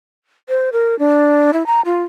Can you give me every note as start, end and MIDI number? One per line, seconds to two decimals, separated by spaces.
0.49 0.69 72
0.72 0.98 70
0.99 1.51 62
1.53 1.66 64
1.66 1.81 82
1.85 2.03 65